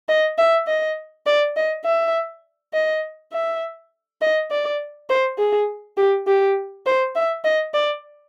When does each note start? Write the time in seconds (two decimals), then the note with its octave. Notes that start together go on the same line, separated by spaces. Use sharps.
0.08 D#5
0.38 E5
0.67 D#5
1.26 D5
1.56 D#5
1.85 E5
2.73 D#5
3.32 E5
4.21 D#5
4.51 D5
5.09 C5
5.38 G#4
5.97 G4
6.27 G4
6.86 C5
7.16 E5
7.44 D#5
7.74 D5